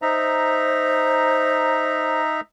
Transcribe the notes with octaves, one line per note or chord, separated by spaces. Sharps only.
D#4 C5 E5 A#5